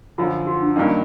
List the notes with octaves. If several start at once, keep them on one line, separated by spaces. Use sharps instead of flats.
F#2 D3 F3 F4
F#4
D4
G2 D#3 F#3 A#3 C#4 D#4